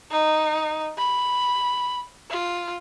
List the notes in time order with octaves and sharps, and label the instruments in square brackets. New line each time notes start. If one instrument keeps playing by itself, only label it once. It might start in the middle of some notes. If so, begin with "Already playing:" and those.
[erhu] D#4
B5
F4